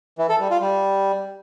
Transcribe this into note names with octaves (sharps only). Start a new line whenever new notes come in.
E3
A4
G3
F4
G3